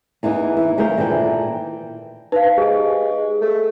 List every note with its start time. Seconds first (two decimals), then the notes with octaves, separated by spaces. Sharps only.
0.23 E2 E3 A#3 D#4
0.57 E3
0.77 E2 C#3 A3 G#4 A#4 C5
0.96 D#2 A#2 E3 A4 G5
2.32 D#4 B4 C5 F5
2.58 G#3 G4 G#5
3.41 A3